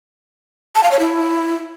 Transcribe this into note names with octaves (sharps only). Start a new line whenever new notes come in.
A5
F5
C#5
E4